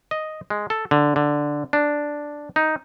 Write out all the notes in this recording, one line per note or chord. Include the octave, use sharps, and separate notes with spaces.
D#5
G#3
A4
D3
D3
D4
D#4